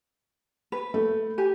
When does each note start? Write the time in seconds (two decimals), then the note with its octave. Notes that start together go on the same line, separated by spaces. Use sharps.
0.72 B4
0.94 A3
1.38 G4 G#5